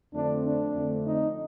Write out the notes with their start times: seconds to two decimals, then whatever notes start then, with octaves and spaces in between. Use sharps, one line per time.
0.13 F2 D3 A3 C4 D4
0.44 D4
0.74 F2 D3 A3 C4
1.05 D#4